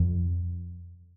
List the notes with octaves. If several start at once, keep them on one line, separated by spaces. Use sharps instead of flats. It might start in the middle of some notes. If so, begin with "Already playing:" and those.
Already playing: F2